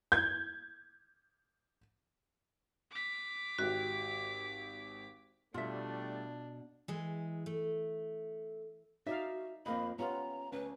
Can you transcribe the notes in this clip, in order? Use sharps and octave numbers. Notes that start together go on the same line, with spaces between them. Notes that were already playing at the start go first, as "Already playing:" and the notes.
G6 G#6
D6 B6
G#1 F#4 G4
B2 G3 A3 D4 F4 E5
E3 G#3
A3
D#4 F#4 D5 E5 F5
F2 A#3 C4 D#5 B5
B3 C#4 F4 G4 A#5
D2 C#4 B4